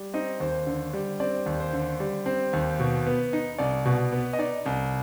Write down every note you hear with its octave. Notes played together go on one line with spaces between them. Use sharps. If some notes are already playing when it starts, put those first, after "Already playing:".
Already playing: G3
C4 D#4 D#5
D#2 C5
D3
G3
C4 D5
D#2
C5
D3
G3
C4
D#2
B2
B3
D#4
C2 D5
B2
B3
D#5
D#4 D5
C2